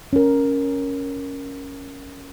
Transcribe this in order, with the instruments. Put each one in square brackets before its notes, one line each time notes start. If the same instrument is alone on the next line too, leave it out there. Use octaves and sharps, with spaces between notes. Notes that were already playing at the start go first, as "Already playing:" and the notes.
[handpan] C#4 A#4